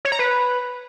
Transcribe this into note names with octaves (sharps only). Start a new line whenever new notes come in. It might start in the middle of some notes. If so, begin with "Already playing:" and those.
C#5
A#5
B4